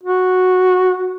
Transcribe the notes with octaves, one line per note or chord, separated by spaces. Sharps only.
F#4